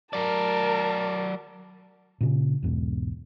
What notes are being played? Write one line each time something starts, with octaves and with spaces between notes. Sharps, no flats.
F#3 A#4 D5 A5
A#2 C#3
B1 E2 G#2 B2